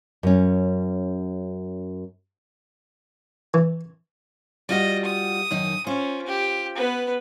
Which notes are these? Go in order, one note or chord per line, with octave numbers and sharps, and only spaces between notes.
F#2 C#4
E3
G3 F4 F#4 D#5
D#6
F#2 D#3 D#4
C#4 F4 C5
G4
B3 B4